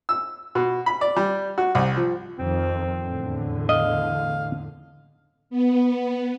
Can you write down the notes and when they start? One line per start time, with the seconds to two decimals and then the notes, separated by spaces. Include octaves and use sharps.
0.09 E6
0.55 B2
0.86 B5
1.01 D5
1.16 G3
1.58 F#4
1.75 C2
1.96 F3
2.38 F2 D#3 C4
3.01 E2 A2 D3
3.69 D#5 F5
5.50 B3